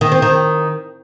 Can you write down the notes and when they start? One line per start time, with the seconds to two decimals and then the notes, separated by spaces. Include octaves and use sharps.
0.01 D#3
0.12 C4
0.22 D#3